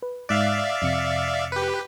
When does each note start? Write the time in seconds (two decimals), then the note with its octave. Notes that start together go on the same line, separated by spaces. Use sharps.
0.02 B4
0.29 G#2 D5 E5 F5 F#6
0.82 F2 C3 C#7
1.52 G4 B4